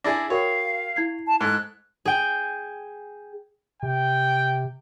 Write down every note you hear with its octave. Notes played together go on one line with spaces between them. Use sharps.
D4 E4 G#4 A#6
F#4 A#4 C#5 F5 G5
E4 G#6 C7
A5
G#2 A4 F#6
G#4 G5
C3 G5